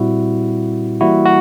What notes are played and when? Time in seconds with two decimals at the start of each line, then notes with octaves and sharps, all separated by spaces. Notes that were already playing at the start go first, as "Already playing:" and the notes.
Already playing: A#2 G3 C4 E4 F#4
1.01 E3 G3 A#3 E4 F#4
1.26 F#4